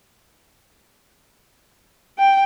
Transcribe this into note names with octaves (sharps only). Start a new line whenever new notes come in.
G5